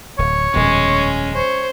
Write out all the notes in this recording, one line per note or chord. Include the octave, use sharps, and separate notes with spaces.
D1 C#5
D#1 F2 B2 G#3 C#4
C5 C#5